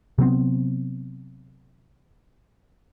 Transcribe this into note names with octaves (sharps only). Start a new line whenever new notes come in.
C3 F#3 B3 C4